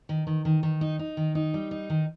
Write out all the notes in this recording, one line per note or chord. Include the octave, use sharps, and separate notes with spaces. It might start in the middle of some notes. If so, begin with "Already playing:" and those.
D#3
D#3
D#3
D#3
D#4
D#4
D#3
D#4
G3
D#4
D#3